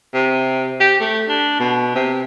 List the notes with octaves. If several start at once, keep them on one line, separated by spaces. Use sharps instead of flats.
C3
G4
A3
D4
B2
C3